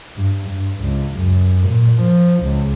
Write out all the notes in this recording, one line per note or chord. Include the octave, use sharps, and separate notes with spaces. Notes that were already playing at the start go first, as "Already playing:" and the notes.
G2
G2
C#2
F#2
A#2
F3
C#2